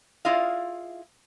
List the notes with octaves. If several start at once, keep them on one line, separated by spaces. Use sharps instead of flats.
E4 F4 G#4 D5 D#5 F5